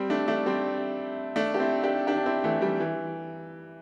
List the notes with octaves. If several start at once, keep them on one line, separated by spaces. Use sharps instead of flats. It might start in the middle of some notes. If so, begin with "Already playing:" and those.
Already playing: G3 C4
A3 D4
A3 D4
G3 C4
A3 D4
G4
C4 E4
D4 G4
D4 G4
D4
C4 E4
E3 A3
G3
E3